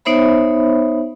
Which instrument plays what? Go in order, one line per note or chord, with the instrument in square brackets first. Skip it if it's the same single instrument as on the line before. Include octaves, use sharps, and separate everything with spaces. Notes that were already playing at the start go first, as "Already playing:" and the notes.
[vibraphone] B3 D#4 C5 C#5 E5 B5